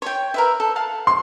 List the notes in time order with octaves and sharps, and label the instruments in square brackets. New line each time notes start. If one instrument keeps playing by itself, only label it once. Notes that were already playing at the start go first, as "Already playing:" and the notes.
[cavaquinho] C#5 G5
A#4 B4 E5
A4
F5 F#5 A5
[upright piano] C6